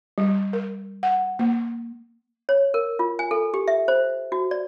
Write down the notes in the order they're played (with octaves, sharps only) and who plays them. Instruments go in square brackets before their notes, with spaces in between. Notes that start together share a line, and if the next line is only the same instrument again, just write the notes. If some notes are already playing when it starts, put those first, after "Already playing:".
[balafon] G3
A#4
F#5
A#3
[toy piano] C#5
A#4
F4
G#5
A4
G4
E5
C5
F#4
D5